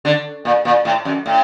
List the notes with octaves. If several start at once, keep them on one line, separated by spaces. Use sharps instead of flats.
D3
A#2
A#2
A2
F#2
A2